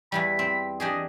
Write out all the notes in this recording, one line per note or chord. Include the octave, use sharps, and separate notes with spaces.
E2 E3 G3 B5
C4
D4 G4 G#4 D#5